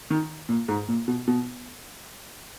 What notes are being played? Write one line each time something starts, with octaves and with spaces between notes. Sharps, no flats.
D#3
A#2
G#2
A#2
B2
B2